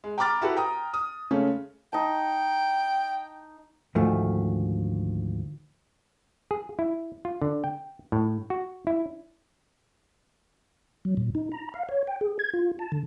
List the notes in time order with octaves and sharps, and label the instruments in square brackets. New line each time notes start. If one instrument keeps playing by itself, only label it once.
[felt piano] G#3
G5 A#5 B5 D6 F6 A6
E4 F#4 G4 A4 B4
G5 A#5 D#6
D#6
C#3 G#3 A3 C#4
[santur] D#4 A5 [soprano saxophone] G5
[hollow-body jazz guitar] D2 G#2 D#3 F3 A3
[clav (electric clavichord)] G#4
E4
F4
D3
G5
A2
F#4
E4
[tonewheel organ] F#3
A#2
D#4
A#5
F5
C#5
G5
G#4
G#6
F4
A5
D3